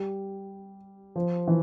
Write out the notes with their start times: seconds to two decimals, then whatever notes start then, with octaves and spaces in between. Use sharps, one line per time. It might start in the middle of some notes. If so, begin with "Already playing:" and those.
Already playing: G3
1.16 F3
1.48 E3